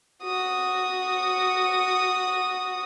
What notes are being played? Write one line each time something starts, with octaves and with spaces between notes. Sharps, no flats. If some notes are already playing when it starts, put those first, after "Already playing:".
F#4 D#6